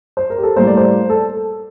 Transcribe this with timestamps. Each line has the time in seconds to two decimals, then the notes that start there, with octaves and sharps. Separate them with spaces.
0.17 C5
0.30 A#4
0.38 G4
0.43 A4
0.56 A2 G3 A#3 C5
0.67 D5
0.77 C5
1.09 A4